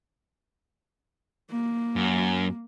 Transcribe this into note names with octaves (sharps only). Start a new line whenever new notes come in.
A#3
F#2